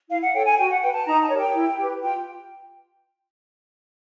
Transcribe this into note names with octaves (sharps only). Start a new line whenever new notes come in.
E4 F5
F#5
A4 C#5 G5
G#5
F#4 G5
F#5
B4 G5
A5
D#4 A#5
A5
G4 A#4 C#5
G5
E4
G4 B4
F4 G5